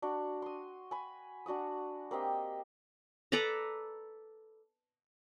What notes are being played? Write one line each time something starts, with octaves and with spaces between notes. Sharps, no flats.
D4 F#4
C6 D#6
G#5 B5
D4 F#4 F#5 D#6
A#3 C4 G4 D#5
A4 B4 D5 A#5